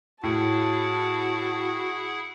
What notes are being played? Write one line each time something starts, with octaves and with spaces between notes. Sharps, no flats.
A2 E4 F#4 G#4 F#5 A5